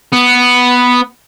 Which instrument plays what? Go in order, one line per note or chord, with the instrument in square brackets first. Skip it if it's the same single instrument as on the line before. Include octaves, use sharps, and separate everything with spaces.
[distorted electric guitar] B3